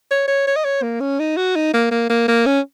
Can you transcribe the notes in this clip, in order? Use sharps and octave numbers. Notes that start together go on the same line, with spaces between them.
C#5
C#5
C#5
D#5
C#5
A#3
C#4
D#4
F#4
D#4
A#3
A#3
A#3
A#3
C#4